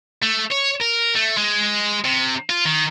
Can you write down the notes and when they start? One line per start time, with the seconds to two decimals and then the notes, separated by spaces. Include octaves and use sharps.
0.22 A3
0.51 C#5
0.80 A#4
1.15 A3
1.37 G#3
2.05 C3
2.50 F4
2.65 D#3